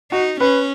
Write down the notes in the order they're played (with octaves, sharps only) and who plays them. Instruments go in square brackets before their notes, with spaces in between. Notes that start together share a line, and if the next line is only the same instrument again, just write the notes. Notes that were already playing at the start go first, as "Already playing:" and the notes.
[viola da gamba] D#4 [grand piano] F#4
[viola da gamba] C#4 [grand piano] B4